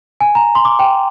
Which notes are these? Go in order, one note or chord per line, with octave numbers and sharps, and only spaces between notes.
G#5
A#5
C6
D6
G5